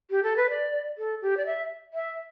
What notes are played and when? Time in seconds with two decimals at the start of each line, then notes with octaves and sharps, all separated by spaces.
0.10 G4
0.23 A4
0.37 B4
0.50 D5
0.98 A4
1.22 G4
1.37 D5
1.46 E5
1.94 E5